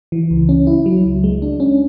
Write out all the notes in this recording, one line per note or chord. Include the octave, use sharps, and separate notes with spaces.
E3
C#2
C#4
E4
F#3
C#2
G#3
D4
C#4